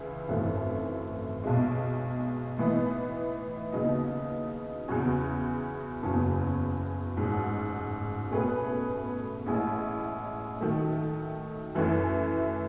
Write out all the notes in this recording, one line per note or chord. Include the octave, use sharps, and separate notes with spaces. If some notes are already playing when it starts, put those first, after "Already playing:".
Already playing: C#2 C#3 E3 E4
G#1 F#2 E3 A3
B1 B2 G#3
A2 E3 B3 D#4
D#2 C#3 F#3 B3 D#4
E2 C#3 F#3 C#4 F#4
F#1 E2 C#3 F#3 C#4
A1 G#2 F#3
B2 A3 C#4 G#4 B4
A1 A2 G#3 C#4 E4
D#3 F#3 A3
F#2 E3 A3 C#4 E4